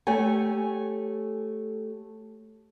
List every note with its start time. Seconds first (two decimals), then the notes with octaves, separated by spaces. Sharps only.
0.07 A3 G4 C#5 G#5